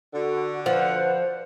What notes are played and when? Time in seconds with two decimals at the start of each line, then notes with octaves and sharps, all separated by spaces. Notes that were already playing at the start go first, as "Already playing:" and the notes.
0.14 D3 F#4
0.66 F3 B4 C5 F#5